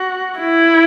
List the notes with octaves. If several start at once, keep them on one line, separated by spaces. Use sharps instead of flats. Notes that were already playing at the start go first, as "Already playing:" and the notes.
Already playing: F#4
E4